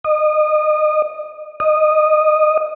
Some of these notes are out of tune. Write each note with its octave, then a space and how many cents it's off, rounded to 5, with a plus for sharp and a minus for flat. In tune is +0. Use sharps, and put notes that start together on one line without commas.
D#5 -30
D#5 -15